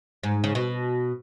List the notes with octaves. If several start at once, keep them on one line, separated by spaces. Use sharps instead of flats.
G#2
C#3
B2